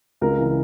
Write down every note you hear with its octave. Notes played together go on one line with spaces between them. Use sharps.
C#2 A#4
C#3 E3